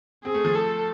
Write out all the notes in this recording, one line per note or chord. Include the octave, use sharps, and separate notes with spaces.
C4 G#4
A3
F3
A4